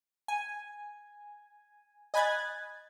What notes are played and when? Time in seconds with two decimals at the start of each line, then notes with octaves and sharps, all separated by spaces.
0.28 G#5
2.14 D#5 G#5 B5 F#6 G#6 A6